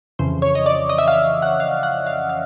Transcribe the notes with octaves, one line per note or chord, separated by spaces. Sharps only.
F2 C#3 E3 C5
C#5
D#5
D5
D#5
E5
F5
F#5
F5
F#5
F5
F5